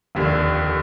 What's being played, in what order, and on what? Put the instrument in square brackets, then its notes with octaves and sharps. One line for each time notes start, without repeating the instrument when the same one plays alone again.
[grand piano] F1 D#2 D3